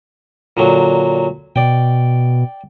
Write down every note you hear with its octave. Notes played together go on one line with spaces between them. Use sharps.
A#2 D3 F#3
B2 D5 G5